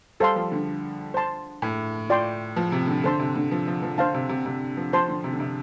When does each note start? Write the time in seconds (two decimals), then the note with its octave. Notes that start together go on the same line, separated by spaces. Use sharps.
0.20 G3 A4 C5 F5 C6
0.36 F3
0.52 D3
1.14 C5 A5 C6
1.62 A2
2.10 F4 D5 G5 C6
2.56 F3
2.72 C3
2.88 D3
3.04 D3 A4 C5 A5 C6
3.20 C3
3.36 D3
3.51 F3
3.67 F3
3.83 F3
3.98 D3 C5 F5 A5
4.14 C3
4.29 C3
4.46 C3
4.77 F3
4.93 F3 C5 A5 C6
5.08 D3
5.24 C3
5.32 D3
5.40 C3